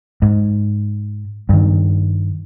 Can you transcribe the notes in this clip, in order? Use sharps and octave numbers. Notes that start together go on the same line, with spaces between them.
G#2
G2 D#3